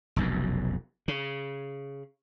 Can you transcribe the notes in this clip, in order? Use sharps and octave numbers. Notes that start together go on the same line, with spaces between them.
F1 B1 F#2
C#3